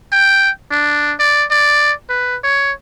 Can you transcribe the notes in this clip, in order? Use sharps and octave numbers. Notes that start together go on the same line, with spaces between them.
G5
D4
D5
D5
B4
C#5